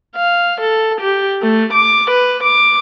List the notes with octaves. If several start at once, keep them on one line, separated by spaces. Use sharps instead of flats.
F5
A4
G4
A3
D6
B4
D6